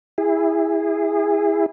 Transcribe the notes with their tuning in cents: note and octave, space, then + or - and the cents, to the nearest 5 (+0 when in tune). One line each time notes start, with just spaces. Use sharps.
E4 +0 G#4 -25